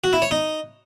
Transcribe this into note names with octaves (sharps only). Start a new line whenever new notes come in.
F#4
E4
C#5
D#4